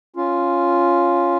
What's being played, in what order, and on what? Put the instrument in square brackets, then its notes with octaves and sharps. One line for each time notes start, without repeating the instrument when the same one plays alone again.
[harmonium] C#4 F4